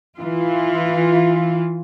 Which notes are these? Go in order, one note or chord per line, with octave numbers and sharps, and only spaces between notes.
E3 F4